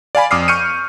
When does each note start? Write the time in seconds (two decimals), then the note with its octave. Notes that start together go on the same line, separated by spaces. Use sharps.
0.15 D5 F5 G#5 B5
0.31 F2 D6 D#6 F6 C7
0.48 C#6 F6 G6 C#7 D#7